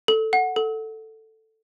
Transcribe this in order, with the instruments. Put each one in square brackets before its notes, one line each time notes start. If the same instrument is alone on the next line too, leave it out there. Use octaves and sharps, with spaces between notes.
[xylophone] A4
F#5
A4